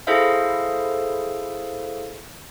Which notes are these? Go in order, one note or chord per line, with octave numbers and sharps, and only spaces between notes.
E4 G#4 A4 C5 E5 F5